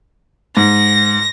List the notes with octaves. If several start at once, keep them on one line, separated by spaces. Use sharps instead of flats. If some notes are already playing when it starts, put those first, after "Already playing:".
G#2 A#6